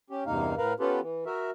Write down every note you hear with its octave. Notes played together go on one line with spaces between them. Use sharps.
C#4 G4
E2 G2 C3 A#3 D#4 F5
A2 A#4 B4 F5
B3 C#4 F4 G4 A4 B4
E3
F#4 A#4 E5